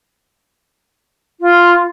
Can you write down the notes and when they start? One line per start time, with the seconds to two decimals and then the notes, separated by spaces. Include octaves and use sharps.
1.38 F4